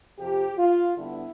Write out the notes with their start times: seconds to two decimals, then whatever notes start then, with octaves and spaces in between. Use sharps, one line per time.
0.18 F2 C3 F3 G4
0.58 F4
0.97 G2 D3 G3 B3 E4